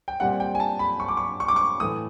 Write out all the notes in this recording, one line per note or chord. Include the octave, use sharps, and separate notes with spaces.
G5
A#2 G3 C4 F#5
G5
G#5
A5
B5
C#6
D6
C#6
C#6
D6
C#6
A2 E3 A3 D#6